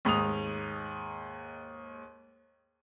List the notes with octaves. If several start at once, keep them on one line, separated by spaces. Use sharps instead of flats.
D#2 G#2 D#6 F7